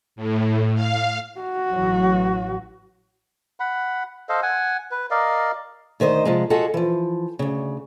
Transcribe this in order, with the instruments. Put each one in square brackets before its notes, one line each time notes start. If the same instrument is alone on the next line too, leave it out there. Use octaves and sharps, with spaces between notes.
[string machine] A2
F5
[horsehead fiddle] F#4
[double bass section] A1 E3 F#3
[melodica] F#5 B5
A4 C5 D#5 F5
F#5 G#5
B4
A#4 D5 D#5 F5
[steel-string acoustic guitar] D2 D#3 C5 D#5
C3 F3 G#3
F4 F#4 G#4 A4 D#5 F#5
E3 F3
D2 C#3